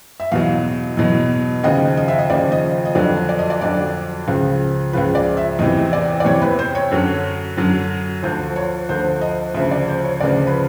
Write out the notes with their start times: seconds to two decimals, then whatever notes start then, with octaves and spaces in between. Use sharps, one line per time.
0.20 E5
0.32 E2 B2 F#3 F5
0.97 E2 B2 F#3
1.64 D#2 C#3 F3 D#5
1.97 D#5
2.08 E5
2.19 D#5
2.30 D#2 C#3 F3 D5
2.52 D#5
2.85 D#5
2.95 F2 D3 F#3 D5
3.29 D5
3.39 D#5
3.50 D5
3.61 F2 D3 F#3 D5
4.28 C#2 C#3 F3
4.93 C#2 C#3 F3 B4
5.15 D5
5.37 E5
5.59 E2 C3 E3 D#5
5.93 D5
6.20 D5
6.25 E2 C3 E3 C#5
6.42 B4
6.59 C5
6.75 C#5
6.91 F#2 D3 F#3
7.57 F#2 D3 F#3
8.23 D2 D3 F3 C5
8.56 C#5
8.89 D2 D3 F3 C5
9.21 D#5
9.54 D2 C#3 F3 E5
9.71 D5
9.88 C5
10.04 C#5
10.20 D2 C#3 F3 D5
10.47 B4